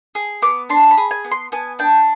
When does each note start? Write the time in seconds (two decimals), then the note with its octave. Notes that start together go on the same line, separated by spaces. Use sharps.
0.15 G#4
0.42 B3 D6
0.70 D4 C6
0.91 B5
0.97 G#4
1.11 G#5
1.25 B3
1.32 C6
1.52 B3 G#5
1.79 D4 G5